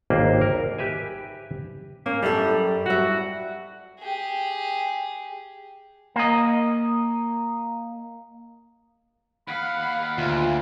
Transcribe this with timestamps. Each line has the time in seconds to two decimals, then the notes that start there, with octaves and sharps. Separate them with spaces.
0.10 G#1 D#2 A#3 B4 C5 D5
0.41 A#4
0.78 G4 B4 E5 G#5
2.06 A#3 C#4
2.23 F#2 G3 A4
2.86 G3 F#4 E5
4.00 G4 G#4
6.16 A#3 D#5
9.48 D#2 F5 F#5 B5
10.18 D2 F4